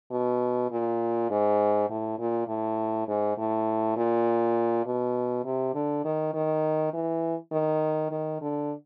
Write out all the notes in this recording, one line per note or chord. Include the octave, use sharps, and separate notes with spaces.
B2
A#2
G#2
A2
A#2
A2
G#2
A2
A#2
B2
C3
D3
D#3
D#3
E3
D#3
D#3
D3